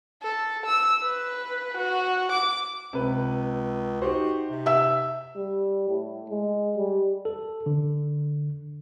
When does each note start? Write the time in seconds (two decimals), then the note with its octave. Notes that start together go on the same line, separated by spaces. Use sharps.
0.22 A4
0.66 E6
1.02 B4
1.77 F#4
2.32 D6
2.93 C#2 C3 B4
4.02 D#4 F#4 G4 C5
4.50 C3
4.66 E5 E6
5.36 G3
5.89 A2
6.30 G#3
6.77 G3
7.25 A4
7.66 D3